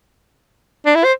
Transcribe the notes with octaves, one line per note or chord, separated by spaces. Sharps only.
D4
E4
C5